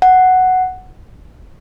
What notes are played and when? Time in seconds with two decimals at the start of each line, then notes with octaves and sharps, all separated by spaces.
0.02 F#5